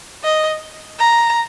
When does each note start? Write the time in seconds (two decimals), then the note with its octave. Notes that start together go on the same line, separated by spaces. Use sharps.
0.23 D#5
0.99 A#5